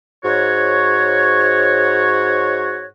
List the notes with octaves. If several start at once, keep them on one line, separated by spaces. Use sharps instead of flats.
G#2 F#4 C#5